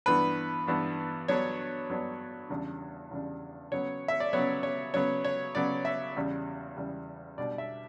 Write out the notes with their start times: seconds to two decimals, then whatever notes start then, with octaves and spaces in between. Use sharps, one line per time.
0.06 G2 E3 B3 D4 B4
0.67 G2 E3 B3 D4
1.28 G2 F#3 B3 D4 C#5
1.90 G2 F#3 B3 D4
2.50 E2 C#3 G3 D4
3.11 E2 C#3 G3 D4
3.71 C#3 F#3 B3 C#5
4.08 E5
4.20 D5
4.33 C#3 F#3 B3 C#5
4.63 C#5
4.94 C#3 F#3 B3 C#5
5.25 C#5
5.55 C#3 F#3 B3 D5
5.85 E5
6.16 E2 C#3 G3
6.77 E2 C#3 G3
7.38 B2 G3 D4 D5
7.58 E5